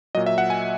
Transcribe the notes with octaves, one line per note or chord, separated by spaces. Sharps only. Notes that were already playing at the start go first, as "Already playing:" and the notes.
A#2 F#3 D#5
E5
F#5
G#5